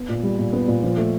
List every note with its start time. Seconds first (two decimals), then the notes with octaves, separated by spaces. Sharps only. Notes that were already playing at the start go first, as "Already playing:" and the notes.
Already playing: B3
0.09 A#2
0.23 G3
0.39 A#2
0.53 B3
0.68 A#2
0.83 F3
0.97 A3